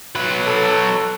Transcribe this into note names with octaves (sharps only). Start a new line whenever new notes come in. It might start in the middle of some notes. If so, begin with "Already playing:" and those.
F#3 B4
A4